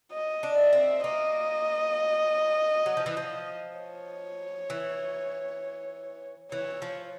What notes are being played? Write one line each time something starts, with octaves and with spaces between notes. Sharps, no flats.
D#5
D4
E5
C4
A#3 D#5
F#3
F3
E3
F3
C#5
E3
E3 C#5
F3